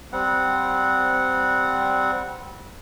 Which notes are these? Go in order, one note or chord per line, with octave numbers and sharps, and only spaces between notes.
G3 C4 F#5